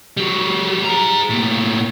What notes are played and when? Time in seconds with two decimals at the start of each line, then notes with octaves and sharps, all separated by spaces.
0.17 G3 F#4
0.85 G#4 A#5
1.29 A2 A#3